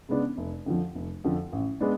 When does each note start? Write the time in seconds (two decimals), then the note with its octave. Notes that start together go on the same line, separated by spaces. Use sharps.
0.09 C#3 G#3 B3 D4
0.37 F1
0.66 F2 D3 F3
0.95 F1
1.24 F2 D3 F3
1.52 A1
1.81 G#3 B3 D4